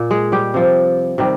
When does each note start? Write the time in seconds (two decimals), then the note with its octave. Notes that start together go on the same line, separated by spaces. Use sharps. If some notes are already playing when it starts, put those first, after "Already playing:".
Already playing: A#2
0.11 G#3 G#4
0.32 G3 G4
0.54 C3 F3
1.18 C3 D#3 G3